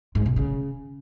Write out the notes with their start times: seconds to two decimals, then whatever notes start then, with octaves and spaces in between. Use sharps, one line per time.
0.15 G#2
0.26 B2
0.36 C#3